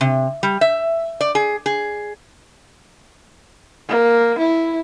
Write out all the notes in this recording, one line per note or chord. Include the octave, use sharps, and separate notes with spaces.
C3
G3
E5
D5
G#4
G#4
A#3
E4